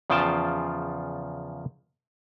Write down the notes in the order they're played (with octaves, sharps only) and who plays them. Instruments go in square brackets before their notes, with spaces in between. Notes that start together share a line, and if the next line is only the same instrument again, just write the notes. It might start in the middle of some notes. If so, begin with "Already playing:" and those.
[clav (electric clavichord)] E2 C#3 F3 F4 G5 A5